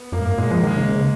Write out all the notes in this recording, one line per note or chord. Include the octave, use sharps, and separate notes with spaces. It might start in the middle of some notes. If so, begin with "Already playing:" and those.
Already playing: B3
F#2 A#3
G#2
F#2 A#3
A#2 G#3
F3 G#3
A#3
D#3 G#3
C#3
C#3